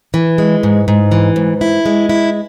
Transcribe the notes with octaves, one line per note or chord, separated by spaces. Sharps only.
E3
G#3
G#2
G#2
E3
G#2
E4
G#3
E4